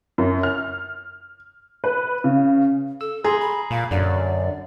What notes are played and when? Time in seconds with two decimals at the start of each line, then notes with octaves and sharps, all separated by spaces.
0.18 F#2
0.43 F6
1.84 B4
2.24 C#3
3.01 A4 E6
3.24 G#4 A#5 C6
3.41 B5
3.70 A#2 F5
3.91 F#2 D3 F#3 D5